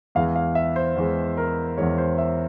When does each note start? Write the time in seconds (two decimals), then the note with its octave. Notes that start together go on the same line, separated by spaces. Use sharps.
0.15 E2 E3 G#3 F5
0.36 F5
0.55 E5
0.76 C5
0.96 E2 E3 G#3
1.37 A#4
1.78 E2 E3 G#3 C#5
1.98 C5
2.18 E5